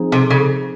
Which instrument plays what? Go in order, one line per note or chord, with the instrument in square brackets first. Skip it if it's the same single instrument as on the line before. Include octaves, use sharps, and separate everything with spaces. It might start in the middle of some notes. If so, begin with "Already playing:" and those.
Already playing: [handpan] F3 C4 D#4 G#4
[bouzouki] C3
C#3